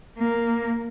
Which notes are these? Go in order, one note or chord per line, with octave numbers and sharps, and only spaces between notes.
A#3